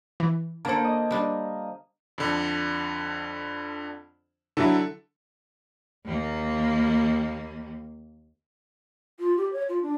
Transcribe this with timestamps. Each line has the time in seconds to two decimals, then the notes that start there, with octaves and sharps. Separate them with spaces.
0.20 E3
0.65 D3 A#3 A4 C5 A5
0.85 D#5
1.11 G3 D4
2.18 F2 D3
4.57 D3 F#3 E4 A4
6.05 D#2 A#3
9.19 F4
9.37 G4
9.53 C#5
9.69 F4
9.82 D4